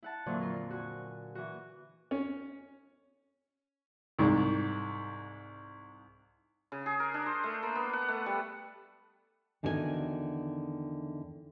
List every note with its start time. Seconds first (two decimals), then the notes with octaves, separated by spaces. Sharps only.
0.03 E4 F#5 A5
0.26 F2 A#2 D3 E3 F#3 A#3
0.40 F4 A#4
0.71 F#4 G#5
1.35 E3 F#4
2.11 C#4
4.19 C2 G#2
6.72 C#3
6.86 G#4
7.00 A#4
7.14 D4
7.26 C5
7.44 A3
7.63 A#3
7.76 B3
7.93 F#5
8.08 A3
8.26 G3
9.63 E2 D3 D#3 F#4 C#5 G#5